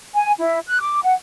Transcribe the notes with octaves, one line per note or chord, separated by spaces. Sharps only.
G#5
E4
F#6
D6
F#5